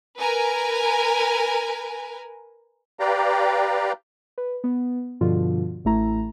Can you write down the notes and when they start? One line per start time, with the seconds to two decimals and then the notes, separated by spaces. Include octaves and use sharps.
0.20 A#4 B4 G#5
2.99 G4 B4 D5 F5 G5 A#5
4.38 B4
4.64 B3
5.21 G2 B2 D3 F3 F4
5.85 A1 A2 A3 E4 A#5